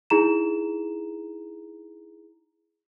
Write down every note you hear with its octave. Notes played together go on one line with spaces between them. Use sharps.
D#4 E4 G#4 A#5 E7